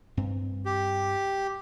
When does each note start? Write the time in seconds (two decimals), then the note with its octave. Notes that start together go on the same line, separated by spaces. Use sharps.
0.17 G2 C4
0.65 G4